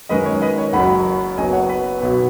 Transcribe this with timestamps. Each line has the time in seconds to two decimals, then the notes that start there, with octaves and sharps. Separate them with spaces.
0.09 F#2 D#3 G#3 C#4 B4 D#5
0.26 C#5
0.42 B4 D#5
0.58 C#5
0.73 F#1 F#2 F#3 F#5 B5
1.38 F#1 F#2 F#3 B3 D#5 G#5
1.53 C#5 F#5
1.69 B4
2.00 B1 B2 B3